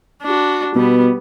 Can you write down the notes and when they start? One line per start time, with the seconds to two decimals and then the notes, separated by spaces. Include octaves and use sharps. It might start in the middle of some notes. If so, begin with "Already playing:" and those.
0.23 D4 F#4
0.75 B2 G3 B3